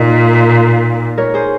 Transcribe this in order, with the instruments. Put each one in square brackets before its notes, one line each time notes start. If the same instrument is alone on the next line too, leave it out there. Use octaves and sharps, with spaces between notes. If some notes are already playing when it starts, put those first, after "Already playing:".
Already playing: [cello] A#2 [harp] D#4
[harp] A#4 C#5
G#4 C5